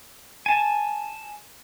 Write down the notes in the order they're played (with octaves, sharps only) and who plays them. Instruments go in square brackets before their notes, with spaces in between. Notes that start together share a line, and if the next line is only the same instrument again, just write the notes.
[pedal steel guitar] G#5 A5